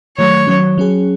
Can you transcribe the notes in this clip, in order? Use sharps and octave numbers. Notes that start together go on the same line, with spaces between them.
D#3 F#3 A3 C#5
D#3 F#3 C#4
F#3 C#4 G#4